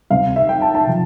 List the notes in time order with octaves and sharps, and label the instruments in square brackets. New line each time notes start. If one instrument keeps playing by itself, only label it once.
[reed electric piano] D2 C3 G3 C4 [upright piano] F5
[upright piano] E5
G5
A5
A5
[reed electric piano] C3 F3